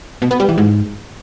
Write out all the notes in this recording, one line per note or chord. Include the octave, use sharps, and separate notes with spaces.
B2
B3
G3
E3
G#2